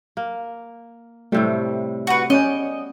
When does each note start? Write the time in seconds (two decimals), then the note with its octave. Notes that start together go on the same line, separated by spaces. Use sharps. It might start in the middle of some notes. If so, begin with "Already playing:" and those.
0.17 A#3
1.32 A2 C3 G3 A3
2.07 F#4 B4
2.30 B3 C#4 D5 D#5 G5